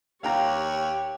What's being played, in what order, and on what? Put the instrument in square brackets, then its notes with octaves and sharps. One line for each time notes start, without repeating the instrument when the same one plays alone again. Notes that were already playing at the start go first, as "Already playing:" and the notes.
[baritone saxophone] D#2 [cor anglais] G4 [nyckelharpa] C#5 [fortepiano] F5 G5 A#5